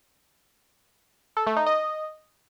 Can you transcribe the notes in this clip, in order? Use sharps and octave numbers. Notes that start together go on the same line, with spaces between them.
A4
A3
D#4
D#5